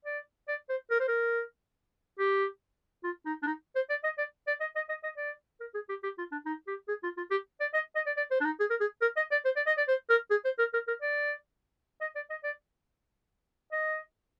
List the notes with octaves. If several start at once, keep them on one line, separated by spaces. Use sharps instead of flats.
D5
D5
C5
A#4
C5
A#4
G4
F4
D#4
D4
D#4
C5
D5
D#5
D5
D5
D#5
D#5
D#5
D#5
D5
A#4
G#4
G4
G4
F4
D4
D#4
G4
G#4
F4
F4
G4
D5
D#5
D#5
D5
D5
C5
D4
D#4
G#4
A#4
G#4
A#4
D#5
D5
C5
D5
D#5
D5
C5
A#4
G#4
C5
A#4
A#4
A#4
D5
D#5
D5
D#5
D5
D#5